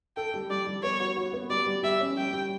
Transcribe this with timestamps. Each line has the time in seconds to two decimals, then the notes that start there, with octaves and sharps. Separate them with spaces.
0.17 A4 G5
0.34 G3
0.50 G3 D5
0.67 G3
0.83 B3 C#5
1.00 F#4
1.16 F#4
1.33 B3
1.50 G3 D5
1.66 G3
1.83 G4 E5
2.00 C#4
2.17 G3 G5
2.33 G3